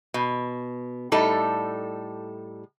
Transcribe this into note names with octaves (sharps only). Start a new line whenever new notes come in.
B2
A2 G3 D#4 A4